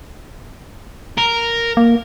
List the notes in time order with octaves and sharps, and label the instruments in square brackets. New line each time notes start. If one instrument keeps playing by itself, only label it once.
[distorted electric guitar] A#4
[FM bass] A#3